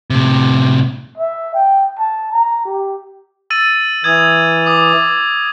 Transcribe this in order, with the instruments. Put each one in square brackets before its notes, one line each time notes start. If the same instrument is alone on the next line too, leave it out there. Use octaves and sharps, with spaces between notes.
[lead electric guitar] A2 C3
[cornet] E5
G5
A5
A#5
G4
[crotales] E6 A6 D#7
[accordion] E3 [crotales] D#6 G#6
[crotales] D6 D#6